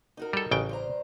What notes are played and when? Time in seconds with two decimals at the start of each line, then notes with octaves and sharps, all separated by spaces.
0.17 D#4 F#4 A#4
0.33 G3 A4
0.51 A1 C#3 G5
0.69 G2 C5 A#5